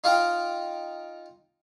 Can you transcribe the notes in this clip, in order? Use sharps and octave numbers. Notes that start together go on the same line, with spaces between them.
D#4 F4 F5 G5